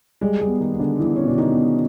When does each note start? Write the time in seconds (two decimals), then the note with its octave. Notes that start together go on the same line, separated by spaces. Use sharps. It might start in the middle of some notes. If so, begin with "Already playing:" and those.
0.21 G3 G#3 G#4
0.41 G#3 G#4
0.47 B3
0.60 D#3 D#4
0.74 B3
0.79 D3 D4
0.99 E3 B3 E4
1.16 C#4
1.25 B2 D4
1.38 D#3 D#4
1.51 B3